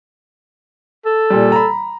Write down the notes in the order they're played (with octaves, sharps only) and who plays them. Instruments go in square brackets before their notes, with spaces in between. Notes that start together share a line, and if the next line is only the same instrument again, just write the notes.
[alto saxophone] A4
[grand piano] A#2 G3
A#5 B5